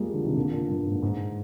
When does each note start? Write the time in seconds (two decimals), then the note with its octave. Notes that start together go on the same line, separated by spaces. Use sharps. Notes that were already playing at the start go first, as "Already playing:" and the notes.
Already playing: F3 G3 G#3 A#3
0.14 D3 F3
0.25 C3 D#3
0.36 A#2 D3
0.53 A#2 D3
0.69 G2 A#2
0.86 G#2
1.02 G#2